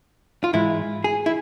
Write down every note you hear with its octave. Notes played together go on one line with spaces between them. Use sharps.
F4
G#2 E3 G#3 E4
G#4
E4